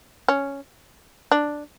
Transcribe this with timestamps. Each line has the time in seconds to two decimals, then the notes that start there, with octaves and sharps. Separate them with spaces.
0.28 C#4
1.32 D4